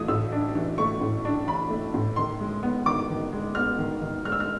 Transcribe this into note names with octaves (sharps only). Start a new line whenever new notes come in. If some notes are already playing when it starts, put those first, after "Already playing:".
Already playing: E3 A3 D#6
A2 E6
D4
E3
A3 C#6
A2
D4
E3 B5
A3
A2
D#3 C6
G#3
B3
D#3 D6
D#3
G#3
B3 F6
D#3
D#3
G#3 F6
E6
F6